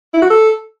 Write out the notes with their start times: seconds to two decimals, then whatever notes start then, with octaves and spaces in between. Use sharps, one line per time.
0.14 E4
0.22 F#4
0.30 A4